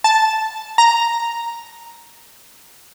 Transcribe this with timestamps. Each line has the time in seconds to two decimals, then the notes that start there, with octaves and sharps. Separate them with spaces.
0.04 A5
0.78 A#5